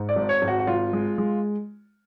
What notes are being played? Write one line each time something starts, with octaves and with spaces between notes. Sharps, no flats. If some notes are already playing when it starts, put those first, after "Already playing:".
Already playing: G#2
D5
G#1
C#5
G#1
F#4
F#4
G#1 F4
G#3
G#3